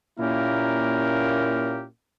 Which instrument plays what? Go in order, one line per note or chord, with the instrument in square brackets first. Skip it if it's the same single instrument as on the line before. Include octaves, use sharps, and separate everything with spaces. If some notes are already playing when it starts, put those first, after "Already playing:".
[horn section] A#2 A#3 C#4 E4 G4 A#4